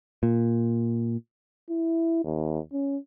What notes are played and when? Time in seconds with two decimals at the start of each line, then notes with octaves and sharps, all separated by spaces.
0.23 A#2
1.70 E4
2.24 D#2
2.72 C#4